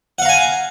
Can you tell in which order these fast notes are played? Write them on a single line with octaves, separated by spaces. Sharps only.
F#5 F5 A#5 G#5